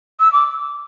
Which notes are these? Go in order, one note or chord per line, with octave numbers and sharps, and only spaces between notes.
E6
D6